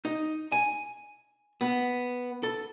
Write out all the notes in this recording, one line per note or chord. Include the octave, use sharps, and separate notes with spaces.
D#4
G#5
B3
A4